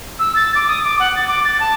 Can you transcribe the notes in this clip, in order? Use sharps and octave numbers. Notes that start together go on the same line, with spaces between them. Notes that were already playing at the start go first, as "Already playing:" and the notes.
E6
A6
D6
D#6
D6
F#5
A6
D6
A6
A5